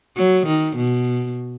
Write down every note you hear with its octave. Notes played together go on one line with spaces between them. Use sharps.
F#3
D#3
B2